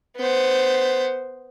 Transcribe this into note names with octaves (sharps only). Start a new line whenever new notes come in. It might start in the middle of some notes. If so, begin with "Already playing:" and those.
B3 C5